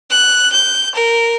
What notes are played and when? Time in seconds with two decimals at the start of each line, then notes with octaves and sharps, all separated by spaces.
0.11 F#6
0.53 G6
0.94 A#4